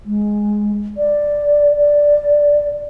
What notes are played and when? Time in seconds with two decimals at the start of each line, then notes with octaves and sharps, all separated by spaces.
0.05 G#3
0.97 D5
1.77 D5